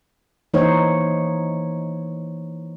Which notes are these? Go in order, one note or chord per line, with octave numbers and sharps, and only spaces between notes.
E3 A#3 D#4 C5 C#5